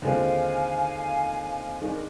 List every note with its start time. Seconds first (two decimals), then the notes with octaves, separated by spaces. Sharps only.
0.02 D#2 D3 G#3 C4 F4 F5 G#5
1.81 D#3 G#3 D4 C5
1.89 A#4